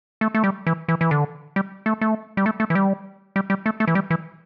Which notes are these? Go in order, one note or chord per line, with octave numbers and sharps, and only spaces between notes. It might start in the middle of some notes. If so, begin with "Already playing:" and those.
A3
A3
G3
E3
E3
E3
D3
G3
A3
A3
G3
A3
A3
E3
G3
G3
G3
A3
A3
E3
G3
E3